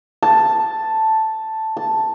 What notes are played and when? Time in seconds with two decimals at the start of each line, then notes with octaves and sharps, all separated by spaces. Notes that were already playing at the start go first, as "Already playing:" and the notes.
0.23 A5
1.77 A5